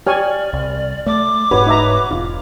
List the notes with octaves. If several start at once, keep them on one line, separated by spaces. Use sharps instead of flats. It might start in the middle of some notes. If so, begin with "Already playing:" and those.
G4 C#5 D5 G#5 F6
C2
A3 D5 D6
E1 G#2 F#4 B4 C#5
D#4 E5 A#5
E1 F4